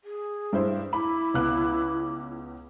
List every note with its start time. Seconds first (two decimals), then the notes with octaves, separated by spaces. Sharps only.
0.04 G#4
0.53 G2 E4 C5
0.93 E4 B5 D6
1.34 C#2 B3 F#6